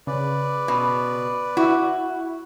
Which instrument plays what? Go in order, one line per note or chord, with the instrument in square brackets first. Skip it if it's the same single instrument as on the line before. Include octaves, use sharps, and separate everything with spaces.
[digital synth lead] C#3 [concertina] B4 D5
[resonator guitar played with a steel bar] B2
[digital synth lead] E4 [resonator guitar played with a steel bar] F#4